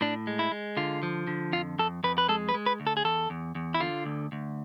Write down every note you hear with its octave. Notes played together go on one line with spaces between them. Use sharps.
A2 D4
G#3
E4
G#3
D3 F4
F3
D3
F2 F4
F2 A4
F2 B4
B4
G#3 A4
B4
G#3
B4
D2
A4
G#4
E2 A4
E2
E2
E4
D3 F4
D2
D2